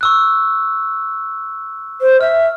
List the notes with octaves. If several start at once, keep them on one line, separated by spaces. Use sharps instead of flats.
C#6 E6 F#6
C5
E5 F6